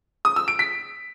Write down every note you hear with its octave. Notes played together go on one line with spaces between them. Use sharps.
D#6
E6
D7
B6